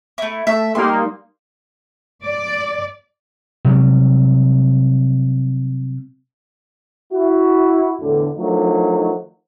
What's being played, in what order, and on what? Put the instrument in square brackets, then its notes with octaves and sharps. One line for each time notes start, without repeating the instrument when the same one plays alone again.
[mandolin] A3 E4
[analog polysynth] A3 [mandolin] E5
[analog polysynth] G3 A#3 D#4 [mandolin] C6
[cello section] D5
[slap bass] C3 F#3 G3
[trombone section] E4 F#4
E2 A2 D3
D#3 F3 F#3 A3 D4 D#4